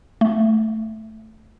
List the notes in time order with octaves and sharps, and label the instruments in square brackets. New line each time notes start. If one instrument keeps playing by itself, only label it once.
[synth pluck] A3